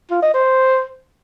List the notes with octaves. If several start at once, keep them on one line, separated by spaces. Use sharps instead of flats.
F4
D#5
C5